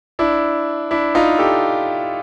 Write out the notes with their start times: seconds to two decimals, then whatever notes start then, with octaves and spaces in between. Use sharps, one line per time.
0.19 D4 E4
0.91 D4 E4
1.15 D#4 F4
1.39 G4 A4